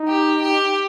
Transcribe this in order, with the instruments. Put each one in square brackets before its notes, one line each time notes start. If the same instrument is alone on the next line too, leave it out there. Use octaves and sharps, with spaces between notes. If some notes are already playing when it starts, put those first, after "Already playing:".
Already playing: [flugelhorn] D#4
[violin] G4
G4